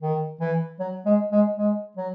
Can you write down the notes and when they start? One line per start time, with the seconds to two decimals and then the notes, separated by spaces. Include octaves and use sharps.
0.02 D#3
0.41 E3
0.80 F#3
1.06 G#3
1.32 G#3
1.58 G#3
1.97 F#3